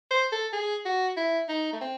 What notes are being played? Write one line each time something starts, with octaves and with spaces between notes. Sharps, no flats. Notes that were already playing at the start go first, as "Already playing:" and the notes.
C5
A4
G#4
F#4
E4
D#4
A3
C4